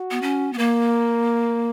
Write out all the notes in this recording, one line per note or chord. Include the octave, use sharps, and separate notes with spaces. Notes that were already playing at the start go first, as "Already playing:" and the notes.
Already playing: F#4
B3
C#4
B3
A#3 A#4